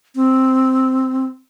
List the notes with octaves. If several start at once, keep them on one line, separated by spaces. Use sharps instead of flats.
C4